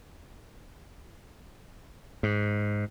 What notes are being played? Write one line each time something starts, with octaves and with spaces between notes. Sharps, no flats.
G#2